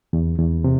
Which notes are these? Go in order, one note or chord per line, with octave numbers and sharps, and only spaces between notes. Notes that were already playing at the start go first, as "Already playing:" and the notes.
E2
E2
C3